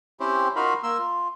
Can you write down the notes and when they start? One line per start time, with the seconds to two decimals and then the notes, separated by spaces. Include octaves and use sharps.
0.20 C4 C#4 E4 G4 C5
0.56 D#4 F4 F#4 A#4 F5 B5
0.83 A#3 A#4 C6 E6
0.98 F4